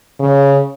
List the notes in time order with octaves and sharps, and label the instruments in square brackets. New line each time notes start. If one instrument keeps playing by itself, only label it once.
[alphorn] C#3